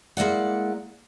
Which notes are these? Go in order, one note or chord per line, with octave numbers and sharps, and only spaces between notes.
G#3 A#3 E4 D5 F#5